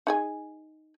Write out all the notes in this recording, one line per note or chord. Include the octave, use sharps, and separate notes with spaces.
D#4 G#4 G#5